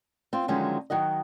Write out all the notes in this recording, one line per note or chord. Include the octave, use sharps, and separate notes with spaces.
C4 F4
D3 D#3 F3 F#3 G#3 C#4
D#3 F#3 F#4 D#5